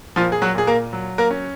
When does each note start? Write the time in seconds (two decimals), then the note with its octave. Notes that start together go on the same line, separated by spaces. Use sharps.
0.16 A#2 F3 F4
0.32 G#4
0.42 F#3 F#4
0.55 A#2 G#4
0.67 A#3 A#4
0.93 F#3
1.18 A#3 A#4
1.31 C#4